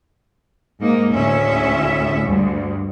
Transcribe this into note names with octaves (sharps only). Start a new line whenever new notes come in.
G#2 A#3 D#4
D2 A2 C#3 C#4 E5
D2 G2